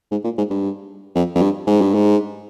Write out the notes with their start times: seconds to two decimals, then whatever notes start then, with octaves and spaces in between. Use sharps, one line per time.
0.11 G#2
0.24 A#2
0.38 G#2
0.50 G2
1.15 F2
1.35 F2
1.42 G2
1.67 G#2
1.81 G2
1.94 G#2